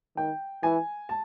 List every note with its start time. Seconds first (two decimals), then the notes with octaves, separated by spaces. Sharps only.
0.17 D#3 G5
0.63 E3 G#5
1.09 A5